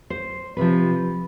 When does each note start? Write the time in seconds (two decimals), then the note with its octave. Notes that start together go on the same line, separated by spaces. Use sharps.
0.10 C5
0.57 C3 F3 B4